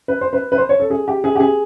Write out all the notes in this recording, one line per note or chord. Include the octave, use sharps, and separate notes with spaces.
B4
C5
B4
B4
C5
C#5
A4
G#4
G4
G#4
G4
G#4